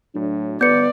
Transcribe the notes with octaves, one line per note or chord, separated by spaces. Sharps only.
A2 F#3 D4
G1 B3 B4 D5 G6 C#7